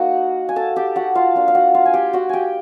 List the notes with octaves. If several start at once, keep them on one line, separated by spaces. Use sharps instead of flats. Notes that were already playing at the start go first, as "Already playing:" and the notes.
Already playing: A#3 D#4 F#4 F#5
G#5
A4 A5
G4 G5
F#4 F#5
F4 F5
A#3 D4 F4
F5
F#4 F#5
F4 F5
G#5
G4 G5
F#4 F#5
G4 G5 G#5